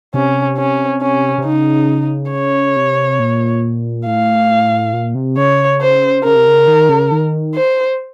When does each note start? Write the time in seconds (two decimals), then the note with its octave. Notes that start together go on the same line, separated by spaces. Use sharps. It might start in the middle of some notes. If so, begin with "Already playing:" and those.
0.14 C3 C#4
0.58 C#4
1.02 C#4
1.38 C3
1.45 C#3 D#4
2.32 C#5
2.76 C3
3.19 A#2
4.06 A2 F5
4.93 A#2
5.15 C3
5.37 C#3 C#5
5.81 C5
6.24 C#3 A#4
6.36 C3
6.47 C#3
6.67 D#3
6.89 C#3
7.12 D#3
7.55 C5